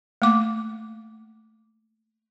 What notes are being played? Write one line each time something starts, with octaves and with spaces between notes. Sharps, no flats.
A3 A#3 D6